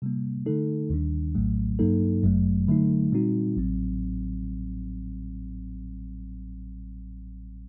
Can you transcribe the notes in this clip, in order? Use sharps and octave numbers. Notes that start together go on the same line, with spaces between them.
C3 G3 A#3
D3 A3 D#4 A4
D#2 D#3 G3 D4
A#1 A2 F#3 A3
G2 F#3 A#3 D#4 A4
G1 F#2 F#3 A3
D3 F#3 A3 D#4
A#2 G3 C4 D#4 F#4
A1 A2 F#3 C4